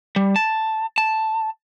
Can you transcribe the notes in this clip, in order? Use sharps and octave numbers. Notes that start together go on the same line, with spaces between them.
G3
A5
A5